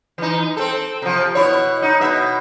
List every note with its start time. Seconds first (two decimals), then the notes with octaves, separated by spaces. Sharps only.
0.18 E3 D#4
0.57 C4 A4
1.02 C3 F3
1.35 B2 E4 C#5
1.82 D#4
2.01 B2 E5